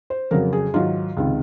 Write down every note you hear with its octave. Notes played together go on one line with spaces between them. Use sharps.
C5
F2 C#3 F#3 A#4
G#4
G#2 D#3 F#3 F4
C#2 C3 D#3